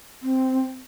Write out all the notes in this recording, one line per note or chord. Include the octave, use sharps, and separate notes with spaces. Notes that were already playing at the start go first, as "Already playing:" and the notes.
C4